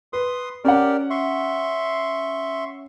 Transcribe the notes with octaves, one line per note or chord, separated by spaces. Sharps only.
B4 C6 D#6
C#4 G4 A#4 D5 F#5
E5 C6 C#6